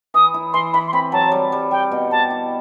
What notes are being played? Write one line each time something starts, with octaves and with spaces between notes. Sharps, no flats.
E3 D#6
E4
E3 C6
E3 B5
C6
C4 B5
F#3 A5
G3
G3
G3 G5
B2
G4 A5
E4